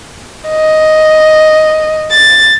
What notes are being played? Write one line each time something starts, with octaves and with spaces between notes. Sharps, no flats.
D#5
A6